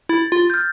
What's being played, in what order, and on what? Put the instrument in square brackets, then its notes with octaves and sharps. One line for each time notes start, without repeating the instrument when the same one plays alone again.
[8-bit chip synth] E4 [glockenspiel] A6
[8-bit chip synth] F4
[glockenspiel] G6
F6